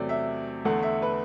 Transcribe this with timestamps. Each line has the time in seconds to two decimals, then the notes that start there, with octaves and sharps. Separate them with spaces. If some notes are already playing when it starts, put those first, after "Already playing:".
Already playing: E2 C3 F#3 A3 D5
0.09 E5
0.65 E2 D3 A3 F#5
0.83 E5
1.02 B4